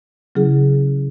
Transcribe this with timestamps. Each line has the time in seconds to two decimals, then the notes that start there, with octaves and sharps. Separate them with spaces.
0.35 C#3 F#3 C#4 E4 G#4